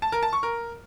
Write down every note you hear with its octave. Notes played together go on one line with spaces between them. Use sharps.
A5
A#4
A5
C#6
A#4